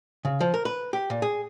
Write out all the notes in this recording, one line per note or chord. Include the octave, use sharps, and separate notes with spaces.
C#3
F3
A#4
B4
G4
A#2
G#4